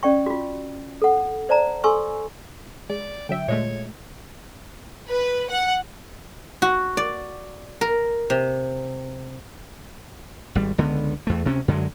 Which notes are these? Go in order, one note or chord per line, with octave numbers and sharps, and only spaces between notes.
C#4 D5 G5 C#6
F4 F#4
A4 F#5
C5 D5 A5 A#5
A4 G#5 C6 C#6 E6
G#3 D5
D3 F#3 E5 G5
A#2 G#3 A3 C#5
B4
F#5
F#4
D5
A#4
C3
G#1 G3
C#2 D3 B3
E2 A3
D2 C3 C4 C#4
F#2 D3 F#3 G#3